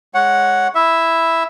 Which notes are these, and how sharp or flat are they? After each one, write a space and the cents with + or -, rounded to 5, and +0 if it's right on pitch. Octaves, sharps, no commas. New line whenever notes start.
G#3 +0 C#5 +0 F#5 +0
E4 +0 E5 +0